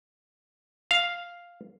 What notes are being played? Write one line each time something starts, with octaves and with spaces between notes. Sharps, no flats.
F5